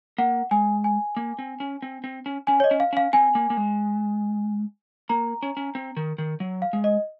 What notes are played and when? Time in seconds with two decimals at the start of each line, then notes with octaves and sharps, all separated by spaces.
0.18 A#3 F#5
0.51 G#3 G#5
0.84 G#5
1.17 A#3
1.39 C4
1.60 C#4
1.82 C4
2.04 C4
2.26 C#4
2.47 C#4 G#5
2.60 C#5
2.64 D#5
2.71 C#4
2.80 F5
2.93 C#4 F5
3.13 C4 G#5
3.35 A#3
3.50 A#3
3.57 G#3
5.09 A#3 A#5
5.43 C#4
5.57 C#4
5.75 C4
5.97 D#3
6.18 D#3
6.40 F#3
6.62 F5
6.73 G#3
6.84 D#5